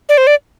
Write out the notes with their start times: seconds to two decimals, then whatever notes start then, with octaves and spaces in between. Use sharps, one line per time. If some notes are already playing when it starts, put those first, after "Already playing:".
0.09 D5
0.18 C5
0.27 D5